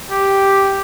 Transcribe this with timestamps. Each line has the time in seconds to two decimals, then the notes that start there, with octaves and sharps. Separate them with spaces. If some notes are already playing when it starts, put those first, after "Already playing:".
0.10 G4